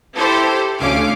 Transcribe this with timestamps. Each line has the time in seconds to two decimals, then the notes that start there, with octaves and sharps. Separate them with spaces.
0.17 E4 G4 A4 C5
0.79 D2 C#4 F5 D6